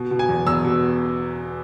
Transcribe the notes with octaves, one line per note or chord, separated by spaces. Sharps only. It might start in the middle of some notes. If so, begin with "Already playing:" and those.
Already playing: B2
B2
G#5
E2
E2 E6
B2